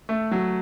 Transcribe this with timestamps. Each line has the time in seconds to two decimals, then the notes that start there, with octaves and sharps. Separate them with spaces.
0.09 A3
0.31 F#3